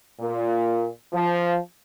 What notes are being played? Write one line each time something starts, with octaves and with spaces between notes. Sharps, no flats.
A#2
F3